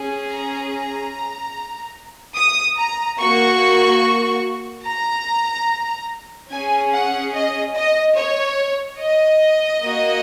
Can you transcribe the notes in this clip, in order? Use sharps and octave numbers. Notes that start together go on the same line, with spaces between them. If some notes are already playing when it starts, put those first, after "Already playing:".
Already playing: C#4 G#4
A#5
A#5
D#6
A#5
A#3 F#4 C#6
A#5
C#4 G#4 G#5
F#5
D#5
D#5
C#5
D#5
A#3 F#4